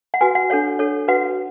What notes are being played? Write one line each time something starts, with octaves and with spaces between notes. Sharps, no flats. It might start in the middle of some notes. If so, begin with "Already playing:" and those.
F#5
F#4 B4 G#5
F#5
D4 A4 C#5 F#5
D4 A4 C#5
F#4 B4 F#5